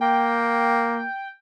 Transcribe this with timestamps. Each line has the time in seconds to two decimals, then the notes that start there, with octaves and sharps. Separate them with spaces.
0.01 A#3 G5